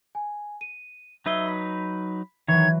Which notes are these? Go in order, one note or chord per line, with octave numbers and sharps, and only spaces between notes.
G#5
D#7
F#3 D#4 B4 E5 E6 G#6 C7 G7
B5 B6
D#3 E3 F#3 C#5 E5 G#6